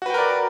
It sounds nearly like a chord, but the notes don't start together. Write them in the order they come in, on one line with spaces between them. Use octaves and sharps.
F#4 B4 G5 A#4 D5